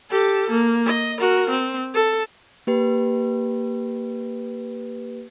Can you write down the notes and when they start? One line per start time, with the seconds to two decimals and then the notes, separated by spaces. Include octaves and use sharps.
0.11 G4 A4
0.50 A#3
0.87 D#5
1.19 F#4 A#4
1.50 C4
1.94 A4
2.67 A#3 G4 B4